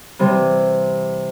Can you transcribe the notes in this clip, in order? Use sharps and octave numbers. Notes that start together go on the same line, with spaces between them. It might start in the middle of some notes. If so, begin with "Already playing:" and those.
C3 E3 G3